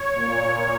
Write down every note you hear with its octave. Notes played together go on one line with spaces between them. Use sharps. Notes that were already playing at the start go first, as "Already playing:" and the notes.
Already playing: C#5
A#2